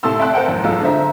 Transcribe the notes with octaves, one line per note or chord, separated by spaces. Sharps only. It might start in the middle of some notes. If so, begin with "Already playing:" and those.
A2 C3 A3 A5 C6 E6
E5 G5 A5 C6 F#6
A#4 C5 F#5 G5 A5
A1 F#2
B1 G#2 G#3 F4 A4 E6
D3 C5 E5 A#5